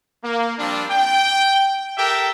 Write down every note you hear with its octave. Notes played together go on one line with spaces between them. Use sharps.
A#3
F3 G3 C4 D4
G5
G4 A4 A#4 E5 G5